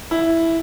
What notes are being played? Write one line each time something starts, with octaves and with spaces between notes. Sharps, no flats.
E4